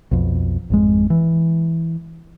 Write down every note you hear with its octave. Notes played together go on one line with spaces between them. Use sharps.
B1 F2
G#1 F2 G#3
E3